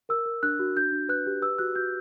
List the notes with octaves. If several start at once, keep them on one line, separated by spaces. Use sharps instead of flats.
A#4 E6
A#4
D4 F#6
F#4
D4 G6
D4
B4 F#6
G4
B4 E6
F#4 F#6
F#4 G6